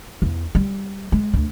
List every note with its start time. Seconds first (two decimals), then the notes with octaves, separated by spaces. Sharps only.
0.22 E2
0.55 G3
1.12 G#3
1.34 D2